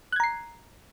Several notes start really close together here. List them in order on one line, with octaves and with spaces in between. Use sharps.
F#6 G#6 A#5 C7